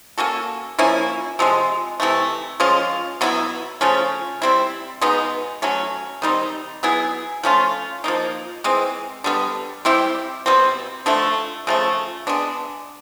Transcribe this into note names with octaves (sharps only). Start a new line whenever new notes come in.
A#3 C#4 F#4 A4
F3 A#3 C#4 E4
C3 F3 G#3
C3 E3 A3
F3 G#3 C#4 F4
B2 F#3 B3 E4
C#3 F3 A3 C#4
G3 C4 E4
B2 G#3 B3 D#4
F#3 A3 C#4
D#3 G3 C4 D#4
F#3 B3 E4 G#4
F3 A3 C#4 F4
F3 A#3 D#4
E3 G#3 C4
D3 G3 B3
G3 C4 E4 G4
B2 G3 C4
D3 F3 A3
C#3 F3 A3
G#3 B3 D4